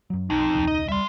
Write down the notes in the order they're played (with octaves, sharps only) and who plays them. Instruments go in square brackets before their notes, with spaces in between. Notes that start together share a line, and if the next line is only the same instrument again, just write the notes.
[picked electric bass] F#2 F#3
[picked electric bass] B1 [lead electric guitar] F2 [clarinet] D#4
[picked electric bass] E1 C#2 C#3
[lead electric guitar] D#5
[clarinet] G3 [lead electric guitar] E5 C6